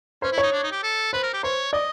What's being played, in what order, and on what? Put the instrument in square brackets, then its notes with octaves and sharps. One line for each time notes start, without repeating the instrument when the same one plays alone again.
[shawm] C#4 [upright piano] C5
[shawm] E4
[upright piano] C#5
[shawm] D#4
D4
D#4
G4
A4
[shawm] B4 [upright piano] C5
[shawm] A#4
G4
[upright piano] C5 [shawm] C#5
[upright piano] D5 [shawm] D#5